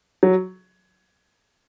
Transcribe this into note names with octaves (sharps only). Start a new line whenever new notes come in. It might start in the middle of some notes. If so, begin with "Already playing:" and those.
F#3